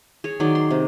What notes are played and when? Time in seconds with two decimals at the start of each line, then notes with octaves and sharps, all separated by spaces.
0.24 G#4 C#5
0.40 D#3 F#3 G#4 D5
0.55 C6
0.71 C3